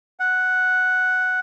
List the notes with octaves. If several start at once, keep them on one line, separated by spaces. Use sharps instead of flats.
F#5